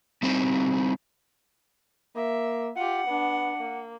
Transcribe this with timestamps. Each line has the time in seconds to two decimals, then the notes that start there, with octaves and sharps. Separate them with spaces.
0.23 G3 C4 D#4 C5
2.16 A#3 E5
2.77 F4 G4 F#5
3.07 B3 D4
3.57 A#3